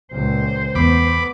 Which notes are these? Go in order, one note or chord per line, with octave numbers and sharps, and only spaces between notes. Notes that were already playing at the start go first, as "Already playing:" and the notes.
C#2 A#2 C5
E2 A3 B3 B5 D6